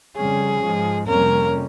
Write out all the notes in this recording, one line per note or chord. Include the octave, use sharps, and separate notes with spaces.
F2 C#3 G3 C#4 G#4
G#2 F3 G#3
F2 C3 G3 A#3 C#4 A#4